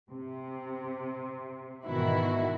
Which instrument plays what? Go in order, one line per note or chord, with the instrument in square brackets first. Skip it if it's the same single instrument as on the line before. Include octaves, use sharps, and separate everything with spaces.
[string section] C3
G#2 B2 D#3 E3 E4 F#4